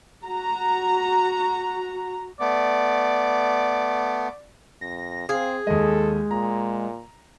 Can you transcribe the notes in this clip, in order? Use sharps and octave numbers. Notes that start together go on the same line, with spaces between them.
F#4 A#5
A3 B3 D5
F2 A#6
C4 G#4 F5
D#2 G#3 A4 D#5
A#2 A#5